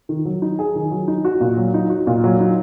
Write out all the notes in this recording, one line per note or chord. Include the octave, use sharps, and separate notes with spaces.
D#3
F#3
D#4
G#4
D#3
F#3
D#4
F#4
A#2
F#3
D#4
F#4
A#2
F#3
D#4